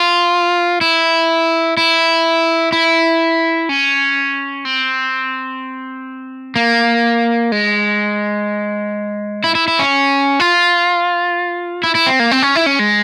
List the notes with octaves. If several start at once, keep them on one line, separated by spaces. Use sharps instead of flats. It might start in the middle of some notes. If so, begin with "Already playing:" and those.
Already playing: F4
E4
E4
E4
C#4
C4
A#3
G#3
E4
E4
E4
C#4
F4
E4
E4
C4
A#3
C4
C#4
E4
C#4
G#3